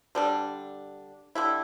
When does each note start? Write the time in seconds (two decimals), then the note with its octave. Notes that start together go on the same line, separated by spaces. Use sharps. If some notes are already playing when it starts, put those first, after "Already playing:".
0.15 D3 G3 D4
1.35 D3 G3 E4